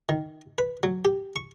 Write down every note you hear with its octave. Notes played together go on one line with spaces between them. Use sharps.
D#3
B4
F#3
G4
C#6